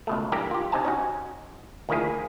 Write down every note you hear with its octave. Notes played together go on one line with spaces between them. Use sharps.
C#2 B2 A3
G2 E3 G3 A#3 G4 A#5
F4 G4
C3 D#4 C5 G#5 A5
C#4 D#4 F#4
D2 D#3 F3 A#3 E4 G#4